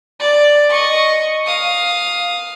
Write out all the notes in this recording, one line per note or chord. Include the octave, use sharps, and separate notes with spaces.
D5
D#5 C#6
F5 D#6